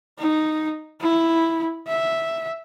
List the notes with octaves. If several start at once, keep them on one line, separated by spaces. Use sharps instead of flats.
D#4
E4
E5